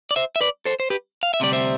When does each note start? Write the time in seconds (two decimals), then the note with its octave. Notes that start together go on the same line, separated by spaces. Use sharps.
0.11 D5
0.16 C5 E5
0.36 E5
0.41 B4 D5
0.65 A4 C5
0.80 C5
0.90 G4 B4
1.23 F5
1.34 E5
1.40 D2 C3 G3 D5
1.53 C5 E5